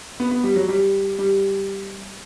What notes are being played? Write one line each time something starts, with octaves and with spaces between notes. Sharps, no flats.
B3
B3
G3
F#3
G3
G3